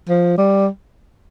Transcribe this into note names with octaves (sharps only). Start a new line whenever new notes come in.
F3
G3